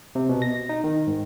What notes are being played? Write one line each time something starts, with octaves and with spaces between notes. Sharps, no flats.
C3
B2
A#6
D#4
D#3
G#2